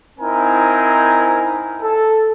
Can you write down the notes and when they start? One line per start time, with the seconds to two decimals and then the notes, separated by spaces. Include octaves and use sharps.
0.19 C4 D#4 E4 A#4 G#5 A#5
1.82 A4